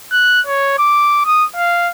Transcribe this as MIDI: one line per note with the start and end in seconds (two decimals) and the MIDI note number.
0.12 0.41 90
0.46 0.74 73
0.79 1.22 86
1.25 1.45 87
1.56 1.91 77